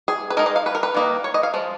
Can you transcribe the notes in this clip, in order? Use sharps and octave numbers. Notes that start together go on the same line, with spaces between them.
G#4
B4
G#3 D#4 A#4
D#5
F5
B4
A#4
B4
D#3 A#3 D#4
C#5
D#5
F5
F3 G#3